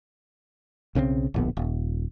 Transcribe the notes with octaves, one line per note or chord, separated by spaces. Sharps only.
B1 C#3 G3 C4
D1 A#1 B3
D#1